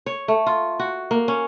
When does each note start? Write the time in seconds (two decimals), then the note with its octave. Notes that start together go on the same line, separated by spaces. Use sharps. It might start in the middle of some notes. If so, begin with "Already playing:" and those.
0.06 C#5
0.28 A3
0.47 F4
0.79 F#4
1.11 A#3
1.28 C#4